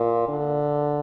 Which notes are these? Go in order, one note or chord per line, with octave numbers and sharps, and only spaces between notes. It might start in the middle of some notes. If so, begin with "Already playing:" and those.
Already playing: A#2
D3